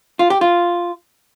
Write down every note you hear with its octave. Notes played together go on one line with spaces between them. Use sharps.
F4
G4
F4